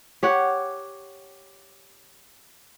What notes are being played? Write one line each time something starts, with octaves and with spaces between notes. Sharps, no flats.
G4 C#5 F#5